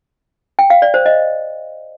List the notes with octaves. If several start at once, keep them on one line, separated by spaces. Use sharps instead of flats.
G5
F5
D5
C5
D#5